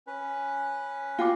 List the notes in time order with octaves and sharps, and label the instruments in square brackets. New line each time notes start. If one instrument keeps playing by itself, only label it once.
[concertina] C#4 B4
[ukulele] F4 F#4 [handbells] F5 G5 D6